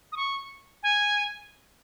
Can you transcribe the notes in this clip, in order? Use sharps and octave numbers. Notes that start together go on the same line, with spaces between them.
D#6
C#6
G#5